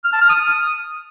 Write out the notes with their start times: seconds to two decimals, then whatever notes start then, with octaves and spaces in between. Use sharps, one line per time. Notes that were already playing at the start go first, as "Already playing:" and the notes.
0.05 F6
0.13 A5
0.22 F6
0.30 D#6